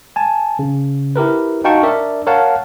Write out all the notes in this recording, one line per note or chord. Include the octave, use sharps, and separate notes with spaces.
G#5 A5
C#3
E4 G4 A#4 B4
D#4 F#4 F5 G5 A5 C#6
D4 A#4 D5 E5
A#4 C#5 F5 F#5 A5